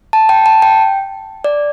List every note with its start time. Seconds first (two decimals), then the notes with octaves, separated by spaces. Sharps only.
0.13 A5
0.29 G5
0.46 A5
0.62 G5
1.44 D5